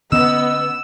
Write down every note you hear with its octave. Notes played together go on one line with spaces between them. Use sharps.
D3 B3 C#4 D#5 E6